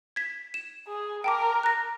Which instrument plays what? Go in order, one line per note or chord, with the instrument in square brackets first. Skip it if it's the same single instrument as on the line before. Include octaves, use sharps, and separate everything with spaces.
[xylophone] G#6 B6
E7
[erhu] G#4
[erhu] A#4 [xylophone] G5 A5 D6
[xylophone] F#6 A#6